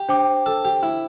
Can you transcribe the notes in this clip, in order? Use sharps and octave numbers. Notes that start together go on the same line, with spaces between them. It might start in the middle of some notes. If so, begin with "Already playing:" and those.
Already playing: G4
D4 C5 G5 D6
A4
G4
E4